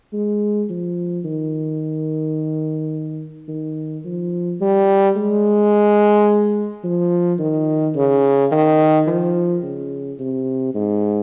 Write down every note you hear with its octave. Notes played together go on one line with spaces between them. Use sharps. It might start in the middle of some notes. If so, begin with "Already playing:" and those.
G#3
F3
D#3
D#3
F3
G3
G#3
F3
D#3
C#3
D#3
F3
C#3
C3
G#2